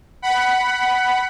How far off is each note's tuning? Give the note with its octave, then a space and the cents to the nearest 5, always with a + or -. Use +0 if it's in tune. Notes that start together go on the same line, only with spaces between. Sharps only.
F#5 +15 B5 +0